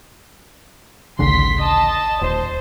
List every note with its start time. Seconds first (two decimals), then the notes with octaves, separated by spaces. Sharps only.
1.19 A1 D2 C#3 C6 B6
1.60 D#5 A5
2.21 D#1 C5